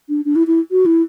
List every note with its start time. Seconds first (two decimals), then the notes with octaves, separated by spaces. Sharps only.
0.09 D4
0.25 D4
0.36 E4
0.47 E4
0.71 F#4
0.86 E4